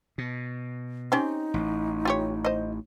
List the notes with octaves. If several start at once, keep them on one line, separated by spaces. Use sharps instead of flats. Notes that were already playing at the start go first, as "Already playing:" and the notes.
B2
C4 C#4 D#4 G4
A1
F4 G4 C#5
C5 D#5